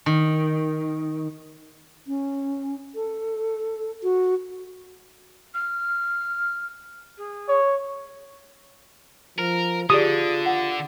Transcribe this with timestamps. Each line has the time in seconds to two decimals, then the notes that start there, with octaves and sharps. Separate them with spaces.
0.06 D#3
2.07 C#4
2.95 A4
4.03 F#4
5.54 F6
7.17 G#4
7.49 C#5
9.38 F3 A#4
9.90 D3 F4 G4 G#4 D5 D#6
10.46 F#5